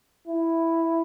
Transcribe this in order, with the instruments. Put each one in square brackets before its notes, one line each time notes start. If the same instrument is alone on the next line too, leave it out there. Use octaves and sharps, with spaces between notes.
[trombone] E4